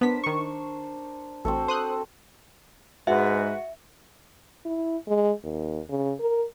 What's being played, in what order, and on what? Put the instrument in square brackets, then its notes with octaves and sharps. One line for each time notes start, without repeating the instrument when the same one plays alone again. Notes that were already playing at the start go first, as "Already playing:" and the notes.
[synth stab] B3 B6 [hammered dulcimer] D4 A#4 C5
[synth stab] D#3 C#6
[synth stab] A1 [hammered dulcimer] C4 F#4 A4
[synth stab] C5 D#6 F#6
[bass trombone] G#2 [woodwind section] G#3 B4 [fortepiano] F#4 [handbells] E5
[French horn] E4
G#3
D#2
C#3
A#4